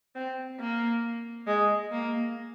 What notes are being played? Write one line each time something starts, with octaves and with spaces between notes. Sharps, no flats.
C4
A#3
G#3
A#3